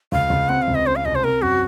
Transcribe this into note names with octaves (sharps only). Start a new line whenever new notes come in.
C#2 F5
C#2
C4 F#5
F5
C#2
D#5
C#4 C5
F5
C2 D#5
C5
C4 A#4
F#2 F#4